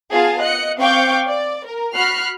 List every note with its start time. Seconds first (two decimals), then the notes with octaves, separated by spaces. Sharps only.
0.11 B3 F4 G#4 F5 A5
0.42 D#5 F#6 C#7
0.78 C4 F5 G5 C#6 D6 G6
1.26 D5
1.67 A#4
1.95 F#4 B5 F6 F#6 C7